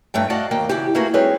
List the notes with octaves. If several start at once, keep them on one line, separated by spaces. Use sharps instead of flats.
G2 F#3 A3 G5
F#4 D5 D#5 F5 F#5 A5
D#2 A#3 G5
C#3 E3 F#4 G4
A3 A#3 E4 F#4 G#4 B4
G3 C4 D#4 G#4 B4 C#5